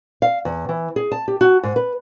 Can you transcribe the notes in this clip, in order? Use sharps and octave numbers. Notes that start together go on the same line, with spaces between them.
F5
E2
E3
G#4
A5
G4
F#4
G#2
B4